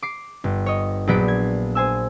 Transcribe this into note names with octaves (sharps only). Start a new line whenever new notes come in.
D6 C7
G1
C#5 D#5
A#1 F#3 B3 D5 B6 D7
G#6
C5 G#5 E6